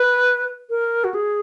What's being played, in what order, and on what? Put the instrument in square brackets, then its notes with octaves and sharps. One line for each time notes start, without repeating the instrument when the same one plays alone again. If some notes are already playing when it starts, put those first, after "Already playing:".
Already playing: [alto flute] B4
A#4
F#4
G#4